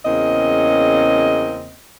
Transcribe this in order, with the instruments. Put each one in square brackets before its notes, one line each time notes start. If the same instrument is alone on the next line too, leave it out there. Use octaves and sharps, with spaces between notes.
[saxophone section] E2 C#3 A#3 C4 C#4 D#5